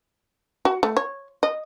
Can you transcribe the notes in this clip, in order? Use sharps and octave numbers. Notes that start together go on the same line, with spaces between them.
F#4
A3
C#5
D#5